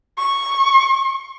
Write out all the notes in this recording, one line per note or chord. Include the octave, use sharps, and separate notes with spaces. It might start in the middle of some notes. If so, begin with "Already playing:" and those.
C#6